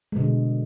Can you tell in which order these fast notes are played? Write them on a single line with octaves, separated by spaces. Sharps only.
G#3 B2 D3